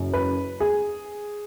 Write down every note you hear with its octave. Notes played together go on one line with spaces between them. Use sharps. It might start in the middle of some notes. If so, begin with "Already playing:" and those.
Already playing: F#1 F#2
B4
G#4